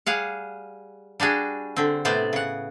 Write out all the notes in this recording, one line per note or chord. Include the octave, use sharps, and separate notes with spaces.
G3 G#4 F5 F#5
G3 D4 F#4 G#4
D3 C4
A2 C3 B3 C5 D5 G5
C#3 F#5